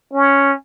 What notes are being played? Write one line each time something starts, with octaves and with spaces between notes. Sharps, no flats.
C#4